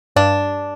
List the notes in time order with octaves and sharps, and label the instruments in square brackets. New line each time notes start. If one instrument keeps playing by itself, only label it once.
[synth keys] G2 [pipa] D4